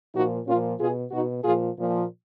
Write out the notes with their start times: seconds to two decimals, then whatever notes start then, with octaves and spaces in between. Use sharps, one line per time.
0.13 A#2 F3 D#4 F#4
0.46 A#2 F3 C#4 F4
0.78 B2 F4 G#4
1.11 B2 D#4 F#4
1.43 A#2 F3 F4 G#4
1.77 A#2 F3